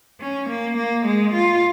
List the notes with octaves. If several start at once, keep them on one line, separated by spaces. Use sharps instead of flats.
C#4
A#3
A#3
G#3
F4